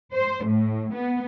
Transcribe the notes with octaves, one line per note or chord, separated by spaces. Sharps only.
C5
A2
B3